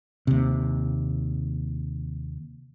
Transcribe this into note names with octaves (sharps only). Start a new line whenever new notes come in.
D#2 C3